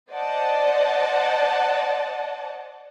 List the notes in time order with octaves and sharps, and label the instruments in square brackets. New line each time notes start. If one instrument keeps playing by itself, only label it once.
[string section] C5 D5 D#5 F#5 A5